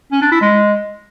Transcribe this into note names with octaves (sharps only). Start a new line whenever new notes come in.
C#4
D4
E4
G#3